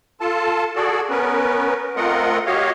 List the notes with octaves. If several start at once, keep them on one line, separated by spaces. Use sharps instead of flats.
F4 A4 A5
F#4 G#4 A4 D5
B3 C#4 A#4 B4
A3 C4 F4 A#4 D#5 F#5
F#4 G4 C#5 D#5 F5